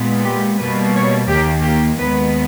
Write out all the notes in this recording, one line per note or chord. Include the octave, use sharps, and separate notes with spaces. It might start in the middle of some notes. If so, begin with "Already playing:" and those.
Already playing: A#2 G#3 B3
G4
B2 G3 A#3 B4
C#5
D#2 D#3 A#3 G4
G4
D#2 D#3 G#3 B3 B4